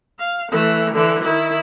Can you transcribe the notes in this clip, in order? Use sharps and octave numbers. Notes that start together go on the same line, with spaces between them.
F5
E3 A3
D3 E3
D#3 E4